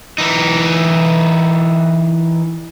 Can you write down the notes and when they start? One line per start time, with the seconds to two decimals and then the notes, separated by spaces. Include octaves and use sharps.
0.18 E3 D#4